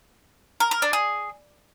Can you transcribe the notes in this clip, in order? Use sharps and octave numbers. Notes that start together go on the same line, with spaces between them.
A#4
A#4
D4
G#4